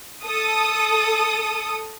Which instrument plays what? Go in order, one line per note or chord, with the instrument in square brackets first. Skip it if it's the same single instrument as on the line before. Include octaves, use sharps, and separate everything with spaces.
[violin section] A4 D#6